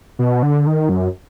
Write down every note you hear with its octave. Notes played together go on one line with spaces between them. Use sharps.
B2
D3
D#3
F#2